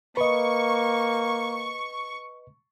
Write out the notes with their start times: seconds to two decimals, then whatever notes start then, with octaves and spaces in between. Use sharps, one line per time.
0.17 A#3 B4 D#5 C#6